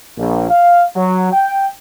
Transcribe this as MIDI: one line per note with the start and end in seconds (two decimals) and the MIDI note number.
0.18 0.48 34
0.50 0.85 77
0.96 1.31 54
1.32 1.70 79